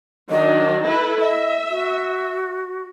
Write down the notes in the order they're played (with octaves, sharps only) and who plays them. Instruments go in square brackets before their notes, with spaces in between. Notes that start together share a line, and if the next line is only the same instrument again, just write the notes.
[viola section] D#3 F#3 D4 [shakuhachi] D#5
[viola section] E4 A4 B4
[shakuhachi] D#5 [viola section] E5
[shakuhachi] F#4